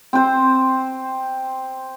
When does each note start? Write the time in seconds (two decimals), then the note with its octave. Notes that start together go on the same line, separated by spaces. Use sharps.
0.13 C4 C5